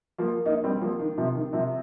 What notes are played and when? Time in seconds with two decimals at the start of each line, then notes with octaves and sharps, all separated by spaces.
0.18 F3 A#3
0.45 A#3 D#4
0.64 G3 C4
0.81 F3 A#3
0.99 D#3
1.18 C3 F3
1.35 D#3
1.53 C3 F3